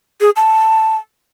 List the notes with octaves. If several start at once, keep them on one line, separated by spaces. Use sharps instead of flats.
G#4
A5